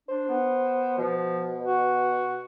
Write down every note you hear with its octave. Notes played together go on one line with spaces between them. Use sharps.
D4 C5
B3
B2 F3
F#4